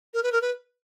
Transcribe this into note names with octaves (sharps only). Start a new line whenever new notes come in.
A#4
B4
A#4
B4